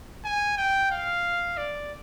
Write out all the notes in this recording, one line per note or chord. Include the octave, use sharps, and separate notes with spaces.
G#5
G5
F5
D5